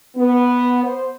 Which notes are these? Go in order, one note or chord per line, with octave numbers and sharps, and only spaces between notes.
B3
C5